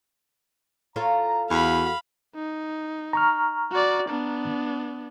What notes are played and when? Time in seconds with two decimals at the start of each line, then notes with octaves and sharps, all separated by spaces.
0.96 F4 A4 C#5 A#5
1.50 E2 F#4 F5 B5
2.35 D#4
3.13 A#5 C#6 F6
3.71 F#4 D5
4.09 B3 D4